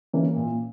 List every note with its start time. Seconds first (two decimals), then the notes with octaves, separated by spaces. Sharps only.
0.13 E3 A#3 C#4
0.36 A#2